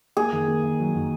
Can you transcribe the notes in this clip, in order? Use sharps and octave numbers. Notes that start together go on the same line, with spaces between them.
A#3 G#4
D#3
A#3
D#3
F#3
D#3